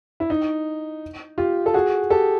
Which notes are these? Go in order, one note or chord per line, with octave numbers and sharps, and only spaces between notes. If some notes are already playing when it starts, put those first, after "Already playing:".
E4
D#4
F4 G4
A4
F#4 G#4
G4 A4